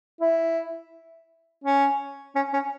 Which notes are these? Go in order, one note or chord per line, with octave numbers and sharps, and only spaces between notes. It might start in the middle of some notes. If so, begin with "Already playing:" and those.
E4
C#4
C#4
C#4